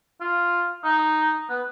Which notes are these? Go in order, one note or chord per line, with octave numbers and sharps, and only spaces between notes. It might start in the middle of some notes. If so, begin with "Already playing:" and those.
F4
D#4
B3